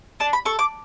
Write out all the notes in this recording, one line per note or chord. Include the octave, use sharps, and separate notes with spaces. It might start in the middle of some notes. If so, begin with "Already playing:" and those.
D4 A5
B5
A4 C#6
D6